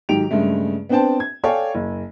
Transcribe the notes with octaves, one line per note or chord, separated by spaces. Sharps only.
G#2 D#3 F#3 G4 D7 F7
G2 C#3 G#3 A3
B3 C4 D4 C5 G5 A5
G#6
A4 C#5 D5 F5 G5 G#5
F#1